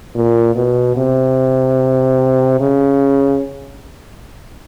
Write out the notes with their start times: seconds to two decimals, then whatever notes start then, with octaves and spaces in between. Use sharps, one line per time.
0.15 A#2
0.55 B2
0.97 C3
2.60 C#3